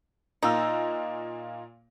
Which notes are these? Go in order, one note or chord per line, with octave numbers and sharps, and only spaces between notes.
A#2 A#3 D#4 E6